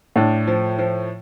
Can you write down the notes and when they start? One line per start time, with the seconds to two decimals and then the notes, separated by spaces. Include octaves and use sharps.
0.16 A2 D4
0.47 F3
0.78 F3